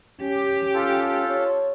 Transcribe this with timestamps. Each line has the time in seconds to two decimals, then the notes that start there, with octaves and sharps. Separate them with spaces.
0.21 C#4 G4
0.74 F4 A4
1.27 C#5